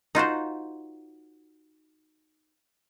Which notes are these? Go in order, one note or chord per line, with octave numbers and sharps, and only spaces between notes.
D#4 F4 F#4 C5